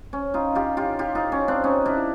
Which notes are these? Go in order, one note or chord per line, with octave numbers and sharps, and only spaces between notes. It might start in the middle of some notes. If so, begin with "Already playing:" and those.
C#4
D#4 F4
F4 G4
F4 G4
F4 G4
D#4 F4
C#4
C4 D4
C#4 D#4
D4 E4